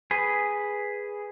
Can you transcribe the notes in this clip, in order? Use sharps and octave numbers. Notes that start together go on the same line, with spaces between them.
G#4 B4